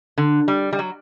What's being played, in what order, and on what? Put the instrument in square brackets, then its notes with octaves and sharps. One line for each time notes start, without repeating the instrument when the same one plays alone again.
[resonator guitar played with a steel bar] D3
G3
G3
F#3